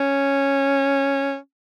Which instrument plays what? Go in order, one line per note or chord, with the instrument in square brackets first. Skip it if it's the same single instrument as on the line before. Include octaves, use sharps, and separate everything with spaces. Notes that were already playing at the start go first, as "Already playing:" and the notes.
Already playing: [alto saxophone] C#4